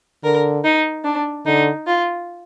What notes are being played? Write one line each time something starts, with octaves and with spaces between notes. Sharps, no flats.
D3 A#4
D#4
D4
D3 D#4
F4